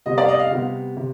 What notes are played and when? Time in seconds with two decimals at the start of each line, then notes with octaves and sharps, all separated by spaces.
0.06 C3 G3 B3 D#5
0.18 D5
0.23 F5
0.28 D#5
0.39 F5
0.51 C3 G3 B3
0.97 C3